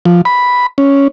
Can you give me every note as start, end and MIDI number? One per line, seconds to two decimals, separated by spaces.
0.05 0.21 53
0.25 0.66 83
0.78 1.08 61